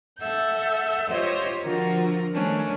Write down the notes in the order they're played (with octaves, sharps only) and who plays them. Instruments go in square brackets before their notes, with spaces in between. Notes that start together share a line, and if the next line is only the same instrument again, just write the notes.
[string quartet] A4 E5 F#5 G6
F4 G4 C5 C#5 D#5
D3 F3 F4 F#4 A#4
D#3 G3 A3 C#4 D4